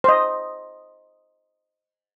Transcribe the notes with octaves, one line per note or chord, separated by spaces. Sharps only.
C5 D#5